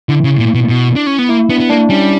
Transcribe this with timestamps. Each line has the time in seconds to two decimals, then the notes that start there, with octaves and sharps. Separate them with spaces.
0.09 D3 E4
0.24 C#3
0.39 A#2
0.55 B2
0.69 B2
0.96 D4
1.07 C#4
1.19 B3
1.29 A#3 E4
1.49 B3 D4
1.60 B3
1.70 A#3 D4
1.89 G3 C#4